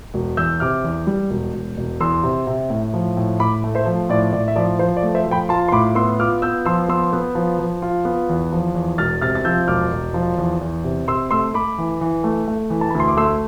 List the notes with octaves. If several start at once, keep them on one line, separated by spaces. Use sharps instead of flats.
E1
E2 E6 G6
C3 D6 F6
E2
G3
E1
E1
E1
E2 C6 E6
C3
C3
A2
F3
A2
A2 B5 D6
A3
C5 E5
F3
A2 D5
A2 D5
E5
F3 D5
F3 C5
D5
A3
C5 E5
F3
G5 B5
F4 A5 C6
C6
A2 B5 D6
B3 C6 E6
F4 D6 F6
B3 E6 G6
F3 C6 E6
B3 C6 E6
B3
F3
F3
F4
B3
E2
F3
E2
E1 F6 A6
C3 F6 A6
A6
F3 E6 G6
E1 D6 F6
E1
F3
E2
E2
C3
C3 C6 E6
A3 C6 E6
A3 B5 D6
E3
E3
A3
A3
E3
A5
B5
D2
C6
D6
A3 C6 E6